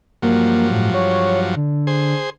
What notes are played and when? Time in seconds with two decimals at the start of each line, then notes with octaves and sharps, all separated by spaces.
0.22 G2 F3 F#3 A#3
0.72 A2
0.94 C#5
1.56 D3
1.87 G#4 C5